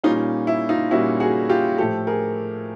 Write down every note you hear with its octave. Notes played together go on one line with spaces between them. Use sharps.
A#2 G3 A#3 C#4 D#4 F4
E4
D#4 F4
A#2 G3 A#3 C#4 E4 F#4
F#4 G#4
F4 G4
A2 F3 A3 G4 A4
G#4 A#4